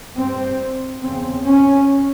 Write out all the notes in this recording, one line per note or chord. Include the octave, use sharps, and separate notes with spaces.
G2 C4
E2 C#3 C4
C#4